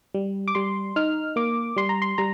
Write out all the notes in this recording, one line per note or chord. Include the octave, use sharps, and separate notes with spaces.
G3
D6
G3 C6
D#4 F6
A#3 D6
G3 C6
A#5
C6
G3 A#5